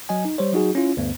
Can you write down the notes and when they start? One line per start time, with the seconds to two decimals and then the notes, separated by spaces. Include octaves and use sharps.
0.09 F#3 D#5 G#5
0.25 D#4
0.38 G3 C5 C#5
0.53 F#3 D#4 F#4 G#4
0.75 C#4 E4 F4
0.97 D2 G2 B3